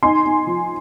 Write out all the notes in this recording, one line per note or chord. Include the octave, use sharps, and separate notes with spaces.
D#4 G#5 C6
D#4
F3